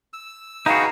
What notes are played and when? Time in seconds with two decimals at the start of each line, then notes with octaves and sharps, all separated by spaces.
0.13 E6
0.66 D#4 F#4 G#4 B4 F5 G5 A#5